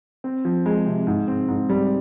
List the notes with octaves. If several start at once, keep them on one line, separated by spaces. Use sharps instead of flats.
C4
F3
G#3
C3
G#2
C4
G#2
G3